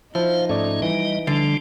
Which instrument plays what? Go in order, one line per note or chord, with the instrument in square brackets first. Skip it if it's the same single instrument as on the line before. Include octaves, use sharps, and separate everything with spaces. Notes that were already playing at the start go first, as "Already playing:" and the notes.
[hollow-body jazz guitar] F3 [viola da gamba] D#4 [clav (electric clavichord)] E4 [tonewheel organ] C5 F5
[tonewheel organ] G#2 C#4 [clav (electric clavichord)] A3 D5
[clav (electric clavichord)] E3 [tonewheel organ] G3 D#5
[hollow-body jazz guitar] D3 [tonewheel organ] F3 G3 D4